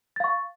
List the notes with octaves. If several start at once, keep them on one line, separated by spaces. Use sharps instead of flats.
F5 C#6 A6